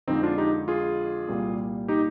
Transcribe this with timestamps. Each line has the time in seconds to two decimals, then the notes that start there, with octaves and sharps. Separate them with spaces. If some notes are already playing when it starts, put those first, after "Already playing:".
0.07 F2 D3 F3 G#3 C4 D#4
0.23 D4 F4
0.38 D#4 G4
0.68 F4 G#4
1.28 C2 A#2 G3 A#3
1.88 D#4 G4